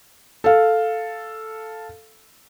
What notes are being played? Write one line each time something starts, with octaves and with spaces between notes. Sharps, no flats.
A4 F5